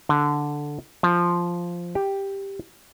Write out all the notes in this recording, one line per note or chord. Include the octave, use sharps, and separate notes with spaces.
D3
F3
G4